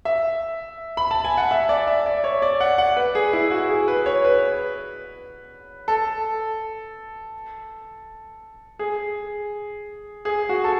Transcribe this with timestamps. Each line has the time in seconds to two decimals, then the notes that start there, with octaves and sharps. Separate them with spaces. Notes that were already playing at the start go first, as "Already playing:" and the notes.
0.05 E5
0.97 B5
1.11 A5
1.24 G#5
1.37 F#5
1.51 E5
1.69 D5
1.87 E5
2.06 D5
2.24 C#5
2.42 D5
2.60 F#5
2.78 F#5
2.97 B4
3.15 G#4
3.33 E4
3.51 F#4
3.70 G#4
3.88 B4
4.06 C#5
4.25 B4
5.88 A4
8.79 G#4
10.25 G#4
10.49 F#4
10.64 A4